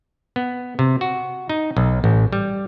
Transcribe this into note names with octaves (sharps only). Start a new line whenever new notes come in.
B3
C3
F#4
D#4
B1
A1
G3